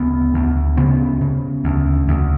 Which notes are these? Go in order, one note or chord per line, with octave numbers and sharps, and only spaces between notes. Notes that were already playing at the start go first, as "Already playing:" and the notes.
Already playing: D2 C#3 B3
D2
C#3 B3
C#3
D2
D2